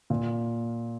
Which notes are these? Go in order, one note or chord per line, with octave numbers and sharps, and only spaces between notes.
A#2